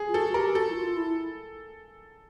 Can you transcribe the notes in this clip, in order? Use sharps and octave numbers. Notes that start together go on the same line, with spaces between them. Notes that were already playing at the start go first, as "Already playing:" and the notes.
Already playing: G#4
F4
F#4 A4
F#4
G4 A#4
F#4 A4
E4
F4
E4